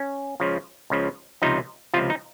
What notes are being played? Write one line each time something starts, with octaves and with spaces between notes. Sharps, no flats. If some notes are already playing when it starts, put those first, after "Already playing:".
Already playing: C#4
C#2 C#3 F3
C#2 C#3 F3
C#2 C3 F3 D#4
C#2 C3 F3 F4
D#4